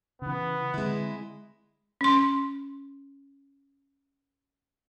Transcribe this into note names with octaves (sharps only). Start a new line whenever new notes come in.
C#3 E3 B3
D3 G#3 C4 E4
C#4 C6